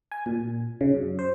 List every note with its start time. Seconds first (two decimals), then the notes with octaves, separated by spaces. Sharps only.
0.12 G#5
0.26 A#2
0.81 C#3
0.94 F#2
1.19 C5